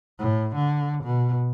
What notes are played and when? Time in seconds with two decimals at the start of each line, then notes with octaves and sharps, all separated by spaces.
0.19 A2
0.55 D3
1.03 B2